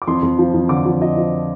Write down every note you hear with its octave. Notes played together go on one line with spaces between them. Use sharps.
D6
F2 C6
F2
F3
F2
D3 D6
F3
F3 D#5
F3